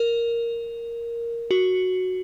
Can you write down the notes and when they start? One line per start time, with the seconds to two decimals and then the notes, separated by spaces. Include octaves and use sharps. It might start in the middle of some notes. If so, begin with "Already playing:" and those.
Already playing: A#4
1.51 F#4